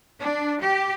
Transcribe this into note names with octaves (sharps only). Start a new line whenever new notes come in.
D4
G4